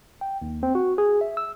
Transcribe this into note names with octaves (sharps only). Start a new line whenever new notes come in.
G5
D#2
C4
F#4
G#4
E5
E6